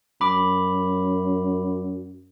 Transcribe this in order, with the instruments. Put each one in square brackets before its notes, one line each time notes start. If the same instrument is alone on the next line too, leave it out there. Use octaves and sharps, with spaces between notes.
[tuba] F#2 [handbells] B5 D6